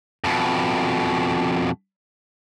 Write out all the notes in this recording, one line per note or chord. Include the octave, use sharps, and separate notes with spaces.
F2 B2